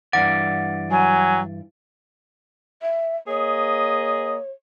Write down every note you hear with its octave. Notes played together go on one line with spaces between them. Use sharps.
G2 E3 D5 F#5
F#3 G#5
E5
A#3 G#4 C#5 D#5